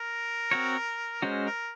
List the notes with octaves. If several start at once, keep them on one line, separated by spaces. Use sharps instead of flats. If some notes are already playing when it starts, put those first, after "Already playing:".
Already playing: A#4
C4 F#4 C#5
G#3 C#4 F#4 C5
A#4